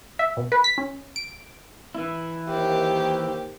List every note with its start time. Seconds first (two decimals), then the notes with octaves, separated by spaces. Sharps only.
0.19 E5
0.37 B2
0.52 B4
0.64 B6
0.78 C#4
1.16 D7
1.95 E3 E4
2.49 D#2 D#3 G4 C5